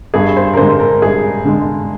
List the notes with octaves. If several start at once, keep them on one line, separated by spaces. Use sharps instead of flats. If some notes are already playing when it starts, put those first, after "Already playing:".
G2 G#4
C5
A#4
D3 G#3 C5
A#4
G2 G#4
D3 G#3